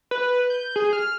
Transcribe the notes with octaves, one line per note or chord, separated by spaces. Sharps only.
B4
G6
G#4
F6